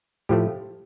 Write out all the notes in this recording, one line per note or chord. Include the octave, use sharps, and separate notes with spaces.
A2 F3 A3 G4